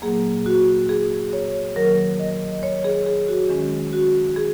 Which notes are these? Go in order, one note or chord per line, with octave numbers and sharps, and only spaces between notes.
A#2 F#3 A#3 G#4
F#4
G#4
C#5
D#3 F#3 A#3 A#4
D#5
C#5
G#4
G#4
F#4
D#3 G#3 C#4
F#4
G#4